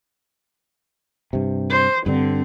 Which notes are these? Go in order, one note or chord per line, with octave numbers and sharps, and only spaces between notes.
G2 C3
C5
G2 D3 C4